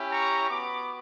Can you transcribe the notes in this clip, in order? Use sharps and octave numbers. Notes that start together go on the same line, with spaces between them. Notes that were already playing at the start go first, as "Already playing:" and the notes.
Already playing: C#4 E4 G4
A#5 C#6
B3 F#4 B5 D6